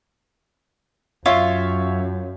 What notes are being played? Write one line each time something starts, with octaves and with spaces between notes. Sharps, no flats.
F#2 F4 C#5 E5 F5